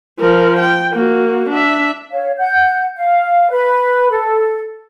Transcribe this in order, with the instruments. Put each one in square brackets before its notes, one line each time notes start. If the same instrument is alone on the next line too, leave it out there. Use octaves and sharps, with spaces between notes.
[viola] F3 A#4
G5
A#3 F#4
D4 E5
[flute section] C#5 F5
F#5 G6
F5
B4 B5
A4